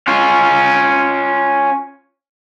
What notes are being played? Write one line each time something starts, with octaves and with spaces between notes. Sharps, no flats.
C#4 F4